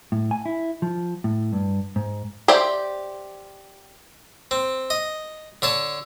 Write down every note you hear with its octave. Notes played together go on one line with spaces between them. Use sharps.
A2
G#5
E4
F3
A2
G2
G#2
G4 C5 D5 E5 G5
C4
D#5
D3 C#5 A5